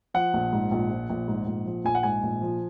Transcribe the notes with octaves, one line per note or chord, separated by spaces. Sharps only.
F3 F#5
A#1
G#2
A#1
F3
A#1
G#2
A#1
F3
A#1 G#5
F#5
G#2 G#5
A#1
F3